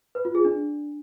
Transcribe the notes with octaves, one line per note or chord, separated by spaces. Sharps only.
B4
F4
G#4
D4